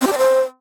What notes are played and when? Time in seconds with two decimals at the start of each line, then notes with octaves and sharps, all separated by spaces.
0.01 C4
0.07 G4
0.12 D5
0.18 C5